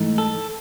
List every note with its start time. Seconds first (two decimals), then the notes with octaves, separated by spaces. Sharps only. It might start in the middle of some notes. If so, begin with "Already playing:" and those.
Already playing: G#2 E3 A3 D#4
0.18 A4